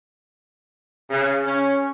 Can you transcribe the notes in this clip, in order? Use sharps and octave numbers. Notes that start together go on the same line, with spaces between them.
C#3
C#4